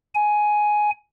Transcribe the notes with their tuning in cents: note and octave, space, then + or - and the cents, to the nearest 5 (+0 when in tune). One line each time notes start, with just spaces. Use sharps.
G#5 +10